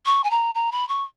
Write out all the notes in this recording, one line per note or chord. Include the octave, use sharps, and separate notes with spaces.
C#6
G#5
A#5
A#5
B5
C#6